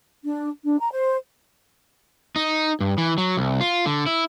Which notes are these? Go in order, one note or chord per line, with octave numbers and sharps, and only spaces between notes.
D4
D4
A#5
C5
D#4
G2
E3
F#3
C2
F4
D3
E4